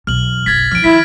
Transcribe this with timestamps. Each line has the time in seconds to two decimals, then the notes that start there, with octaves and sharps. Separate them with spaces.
0.07 B1 E2 F6 F#7
0.46 F#1 B1 G#6 A6 B6
0.71 D3 F3 F6 D7
0.84 D#3 F3 E4 B6